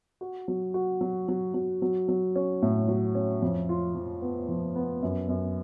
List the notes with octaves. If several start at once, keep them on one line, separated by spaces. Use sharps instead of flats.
F#4
F#3
F#4
F#3
F#3
F#3
F#3
F#3
C#4
A2
F#3
C#4
F2
F4
F3
B3
F3
B3
F#2
F#2